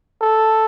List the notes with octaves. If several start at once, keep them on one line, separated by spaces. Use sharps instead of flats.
A4